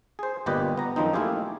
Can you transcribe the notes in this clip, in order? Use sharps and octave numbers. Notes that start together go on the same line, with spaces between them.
G#4 C5
G1 A#2 G4 B4 D#5
B3 A#5
F#2 D#3 F3 C4 D#4
A3 A#3 E4 F4 G4 G#4